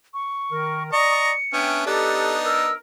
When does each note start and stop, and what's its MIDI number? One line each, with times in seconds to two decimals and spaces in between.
0.14 0.83 85
0.51 0.90 51
0.51 0.90 70
0.92 1.33 74
0.92 1.31 75
0.92 1.31 82
0.92 1.31 85
0.92 1.62 97
1.53 1.83 59
1.53 1.83 61
1.53 1.86 62
1.53 1.86 76
1.53 1.86 79
1.87 2.71 59
1.87 2.71 62
1.87 2.71 63
1.87 2.35 67
1.87 2.35 69
1.87 2.37 90
2.45 2.77 70
2.45 2.73 88